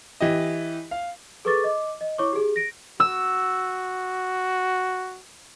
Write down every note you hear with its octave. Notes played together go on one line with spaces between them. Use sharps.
E3 G4 D#5
F5
G#4 A4 B4 C#6 D6 A6
D#5 D6
D#5
E4 C#5 C#6 D6
G4 G#4
A#6 D7
F#4 E6